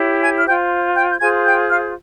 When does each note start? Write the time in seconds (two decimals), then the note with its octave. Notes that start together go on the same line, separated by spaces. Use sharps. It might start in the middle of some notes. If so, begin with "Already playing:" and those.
Already playing: E4 G4 C#5
0.21 G#5 G#6
0.39 F6
0.46 F4 C5 G5 G6
0.95 G5 G6
1.11 G6
1.20 F4 G#4 C5 G#5 G#6
1.45 G5 G6
1.69 F5 F6